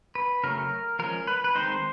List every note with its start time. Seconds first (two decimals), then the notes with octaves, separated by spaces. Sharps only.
0.15 B4
0.44 C#3 F#3 A3 C#4 A#4
0.99 F3 G#3 C#4 A#4
1.27 B4
1.44 B4
1.55 D#3 G#3 C4 D#4 C5